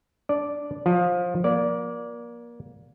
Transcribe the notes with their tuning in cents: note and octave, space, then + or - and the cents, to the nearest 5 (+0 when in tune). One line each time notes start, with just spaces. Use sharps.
D4 -10 D5 +0
F3 +20 F4 +20
A#3 +30 D5 -10